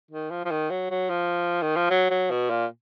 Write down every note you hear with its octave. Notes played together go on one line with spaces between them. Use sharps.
D#3
F3
F3
D#3
F#3
F#3
F3
D#3
F3
F#3
F#3
B2
A#2